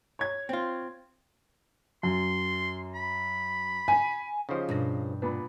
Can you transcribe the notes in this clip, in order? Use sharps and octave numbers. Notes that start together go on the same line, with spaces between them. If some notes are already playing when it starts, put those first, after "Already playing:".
C#5 G#6
C4 F4
F#2 C6
B5
G#5
C#3 F3 D#4 G4 C5
G2 B2 D4 A#6
A#2 B3 D4 B4 B5